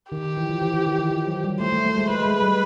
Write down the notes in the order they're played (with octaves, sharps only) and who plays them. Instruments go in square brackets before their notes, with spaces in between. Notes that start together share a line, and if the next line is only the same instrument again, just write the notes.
[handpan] D#3 [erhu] G4
[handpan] E3
F3
E3
E3
D#3
E3
F3
F#3
G3
[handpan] A3 [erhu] C5
[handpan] A3
A3
G#3
[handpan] G#3 [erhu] B4
[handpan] G#3
G3